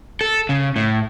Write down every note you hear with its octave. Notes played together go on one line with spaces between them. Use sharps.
A4
C#3
A2